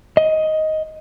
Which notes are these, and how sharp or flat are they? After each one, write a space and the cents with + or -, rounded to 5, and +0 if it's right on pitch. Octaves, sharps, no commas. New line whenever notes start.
D#5 +10